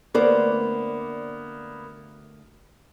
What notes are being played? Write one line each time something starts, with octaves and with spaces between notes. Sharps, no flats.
D2 A#3 B3 C5 D5